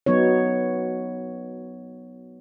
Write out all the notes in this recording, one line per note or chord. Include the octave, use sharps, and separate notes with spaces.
F#3 B3 D#4 C#5